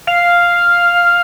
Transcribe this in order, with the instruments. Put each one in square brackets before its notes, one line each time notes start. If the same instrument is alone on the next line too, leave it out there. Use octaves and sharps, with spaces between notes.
[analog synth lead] F5